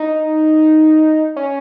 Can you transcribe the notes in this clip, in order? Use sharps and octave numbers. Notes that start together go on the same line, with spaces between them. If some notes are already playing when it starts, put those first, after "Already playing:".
Already playing: D#4
C#4